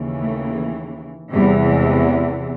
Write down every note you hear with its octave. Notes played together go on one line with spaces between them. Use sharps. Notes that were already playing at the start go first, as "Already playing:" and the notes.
Already playing: D#2 C#3 E3
A3
E2 C3 E3 G3
G#3